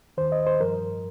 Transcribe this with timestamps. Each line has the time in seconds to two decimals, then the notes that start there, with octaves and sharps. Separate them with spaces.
0.17 D#2 D#3 C5
0.32 D#5
0.46 C5
0.60 G2 F3 A#4